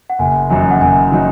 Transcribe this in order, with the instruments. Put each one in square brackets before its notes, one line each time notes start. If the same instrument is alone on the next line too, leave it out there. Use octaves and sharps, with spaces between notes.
[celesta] F#5
[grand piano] F#1 [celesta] G#5
[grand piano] F#2 D#3 F#3 D#4 [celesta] G#5
[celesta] F#5
[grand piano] F#1 [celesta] G#5
[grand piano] D#3 F#3 D#4